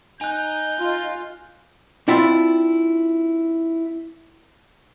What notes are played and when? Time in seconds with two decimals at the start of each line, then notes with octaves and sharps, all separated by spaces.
0.21 D#4 G#5 F#6 G6
0.79 F4
2.08 C4 D4 E4 F4 E5